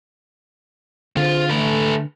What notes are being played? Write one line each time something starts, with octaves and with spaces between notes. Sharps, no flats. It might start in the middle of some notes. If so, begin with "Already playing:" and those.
D3 C4 F4 G#4 C5
A3 A4 B4